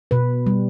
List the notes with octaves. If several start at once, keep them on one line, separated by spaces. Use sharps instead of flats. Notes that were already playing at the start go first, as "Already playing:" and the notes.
B2 B4
G3